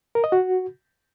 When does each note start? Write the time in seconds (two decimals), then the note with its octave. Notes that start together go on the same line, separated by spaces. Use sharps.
0.15 A#4
0.24 D#5
0.32 F#4